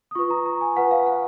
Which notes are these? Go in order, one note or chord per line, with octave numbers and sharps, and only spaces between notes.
D#6
F4 B4 C#6
A#5
A#5
G#5
F4 B4 F#5
F5
F#5